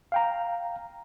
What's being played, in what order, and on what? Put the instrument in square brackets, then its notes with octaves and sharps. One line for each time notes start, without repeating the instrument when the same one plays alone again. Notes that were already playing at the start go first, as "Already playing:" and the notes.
[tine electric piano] F5 G5 A#5